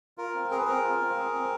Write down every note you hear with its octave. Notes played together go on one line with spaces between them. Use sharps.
F4 A#4
C4
G#4 A#4
B4
C4 A#4
F4
C4
G#4
C4